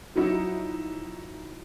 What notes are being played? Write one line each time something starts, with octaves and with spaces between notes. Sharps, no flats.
F3 F#3 D#4 E4 F#4